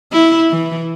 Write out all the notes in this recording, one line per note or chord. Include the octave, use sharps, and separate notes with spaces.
E4
E3